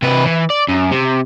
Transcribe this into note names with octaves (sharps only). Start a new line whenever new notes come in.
C3 B4
E3
D5
F#2
C3